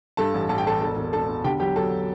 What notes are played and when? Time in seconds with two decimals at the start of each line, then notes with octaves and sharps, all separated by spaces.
0.17 G2 A4 A5
0.34 A1
0.49 A1 A5
0.58 G5
0.66 A1 A4 A5
0.81 E1 A4 A5
0.96 E1
1.13 E1 A4 A5
1.29 E1
1.44 D3 G4 G5
1.60 F#3 G4 G5
1.76 F#3 A4 A5